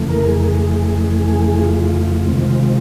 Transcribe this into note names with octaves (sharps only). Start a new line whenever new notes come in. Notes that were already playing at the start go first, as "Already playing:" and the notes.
Already playing: F2 C#3 E3 A3
A#4
G#4
F4
C3 D#3 G#3 C4